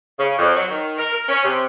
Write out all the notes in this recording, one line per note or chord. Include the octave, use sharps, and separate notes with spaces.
C#3
F2
F#3
D#3
A#4
A#4
C#4
C3